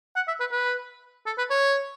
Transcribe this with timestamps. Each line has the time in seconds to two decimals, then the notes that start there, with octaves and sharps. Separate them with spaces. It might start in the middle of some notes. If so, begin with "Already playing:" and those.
0.16 F#5
0.28 E5
0.40 B4
0.52 B4
1.26 A4
1.38 B4
1.50 C#5